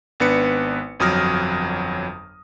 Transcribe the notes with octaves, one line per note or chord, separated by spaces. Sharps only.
G#1 B3 D4 B4 C#7
G1 F2 F#3 D#6 F6 A#6